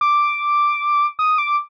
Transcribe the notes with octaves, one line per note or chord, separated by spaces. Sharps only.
D6
D#6
D6